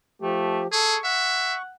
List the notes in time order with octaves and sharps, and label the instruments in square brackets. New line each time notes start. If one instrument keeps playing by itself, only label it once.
[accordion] F3 G4 [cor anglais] A3
[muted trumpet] G#4 [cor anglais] A4 [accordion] C#6
[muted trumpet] E5 [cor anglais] F#5